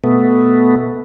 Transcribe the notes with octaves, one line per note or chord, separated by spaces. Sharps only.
B2 A3 B3